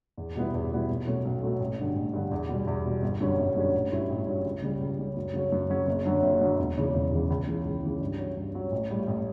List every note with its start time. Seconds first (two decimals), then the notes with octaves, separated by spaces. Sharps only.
0.18 E2
0.36 B2 G3 B3 E4
0.54 E2
0.71 B2 G3 B3 E4
0.90 B1
1.07 B2 F#3 A3 C#4
1.25 B1
1.42 B2 F#3 A3 C#4
1.60 A1
1.78 G2 D3
1.96 A1
2.13 G2 D3
2.31 E2
2.49 B2 G3
2.67 E2
2.85 B2 G3
3.02 G1
3.21 F#2 D3 G3 C#4
3.39 G1
3.56 F#2 D3 G3 C#4
3.74 A1
3.92 G2 F#3 C#4 E4
4.10 A1
4.27 G2 F#3 C#4 E4
4.45 C#2
4.62 C#3 G3
4.81 C#2
4.99 C#3 G3
5.17 F#2
5.34 C#3 F#3 C#4
5.52 F#2
5.69 C#3 F#3 C#4
5.87 F#1
6.05 F#2 D3 F#3
6.23 F#1
6.41 F#2 D3 F#3
6.59 E1
6.77 E2 C#3 E3
6.94 E1
7.12 E2 C#3 E3
7.30 C#2
7.47 C#3 E3
7.65 C#2
7.83 C#3 E3
8.01 G2
8.18 F#3 C#4
8.37 G2
8.54 F#3 C#4
8.72 A1
8.90 A2 G3
9.07 A1